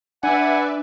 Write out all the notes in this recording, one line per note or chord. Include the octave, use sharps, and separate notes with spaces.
D4 B4 D5 E5 F#5 G#5